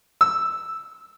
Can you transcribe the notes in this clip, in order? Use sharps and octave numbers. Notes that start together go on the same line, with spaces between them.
E6